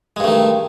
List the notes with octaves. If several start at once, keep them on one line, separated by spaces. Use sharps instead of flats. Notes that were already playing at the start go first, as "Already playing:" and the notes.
G2 D#3 G#3 A3